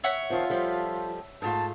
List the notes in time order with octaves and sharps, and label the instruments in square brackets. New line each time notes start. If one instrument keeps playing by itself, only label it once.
[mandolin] C#5 E5 F#5
[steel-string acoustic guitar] D#3 F3 C4 [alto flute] F4
[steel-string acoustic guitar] F3 G3 A4
[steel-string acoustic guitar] G#2 A3 F4 [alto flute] A5